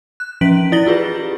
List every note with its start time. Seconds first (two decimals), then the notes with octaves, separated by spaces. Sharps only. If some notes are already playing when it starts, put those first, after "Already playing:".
0.20 F#6
0.41 E3 F3 C#4 B6 D7 F#7
0.72 E4 D5 A6 A#6 F#7 G7
0.86 F4 G4 G#4 B4